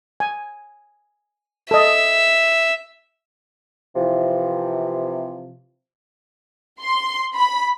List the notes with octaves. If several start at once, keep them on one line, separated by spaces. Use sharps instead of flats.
G#5
A4 D#5 E5
C3 E3 F3
C6
B5